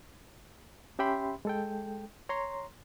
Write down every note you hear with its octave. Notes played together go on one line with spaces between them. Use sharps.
C#4 G4 E5 G5 B5 C6
G#3 A4 G5
C#5 A#5 C6